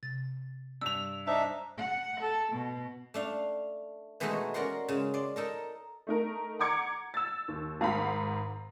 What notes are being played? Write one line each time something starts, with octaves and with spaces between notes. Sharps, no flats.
C3 A6
G2 E6 F7
D4 D#4 C5 E5 A#5
F#5
A4
B2
A3 D4 F5
B2 E3 G#3 A3 D#4 F#4
C#4 F#4 A#4 D5 F#5 C6
C#3 G#3
D5 C6
D#4 A4 A#4
A3 D#4 A#4
F#5 A#5 D6 G#6 C#7
E6 A6
D#2
G#1 G#2 F5 F#5 B5